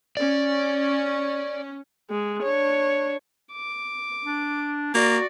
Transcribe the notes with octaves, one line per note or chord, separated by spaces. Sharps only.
C#4 D5
G#3
D4 C#5
D6
D4
A#3 F#4 D5